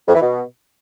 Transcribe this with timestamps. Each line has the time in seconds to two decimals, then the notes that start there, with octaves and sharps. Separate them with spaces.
0.08 F2
0.15 E3
0.22 B2